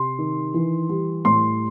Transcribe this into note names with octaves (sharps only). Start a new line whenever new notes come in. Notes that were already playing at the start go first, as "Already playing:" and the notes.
Already playing: C3 C6
D#3
E3
G3
A2 C6